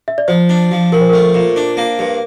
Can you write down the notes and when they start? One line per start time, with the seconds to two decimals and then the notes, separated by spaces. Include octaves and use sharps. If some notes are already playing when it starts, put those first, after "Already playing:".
0.08 E5
0.18 D5
0.28 F3 C5
0.49 D4
0.71 F3
0.92 F3 A#4
1.01 C5
1.09 A3 A#4
1.34 A#2
1.56 D4
1.77 A#3
1.99 G2